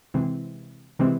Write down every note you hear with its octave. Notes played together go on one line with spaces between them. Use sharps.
C3 E3 G#3 C4
C3 E3 G#3 C4